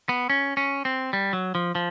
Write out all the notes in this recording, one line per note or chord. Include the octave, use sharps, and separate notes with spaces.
B3
C#4
C#4
C4
G3
F#3
F3
F3